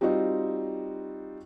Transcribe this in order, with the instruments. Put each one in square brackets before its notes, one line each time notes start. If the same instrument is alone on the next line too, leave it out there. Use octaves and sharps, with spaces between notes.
[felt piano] G3 C4 D#4 F4 F#4 D#5